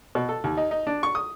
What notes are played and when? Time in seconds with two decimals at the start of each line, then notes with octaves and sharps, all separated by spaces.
0.15 B2
0.29 A4
0.44 D#2
0.57 D#4
0.71 D#4
0.87 D4
1.03 C#6
1.15 D#6